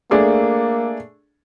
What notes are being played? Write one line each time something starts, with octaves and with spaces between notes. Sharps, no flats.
A3 A#3 D4 G#4